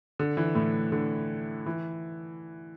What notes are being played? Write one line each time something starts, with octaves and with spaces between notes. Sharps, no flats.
D3
E3
A2
D3
E3